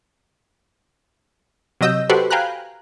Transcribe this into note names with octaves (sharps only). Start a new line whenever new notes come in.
C3 F#3 D#5 E6 G6
F#4 G4 A4 B4 C5
F5 G5 G#5 A#5 B5 F#6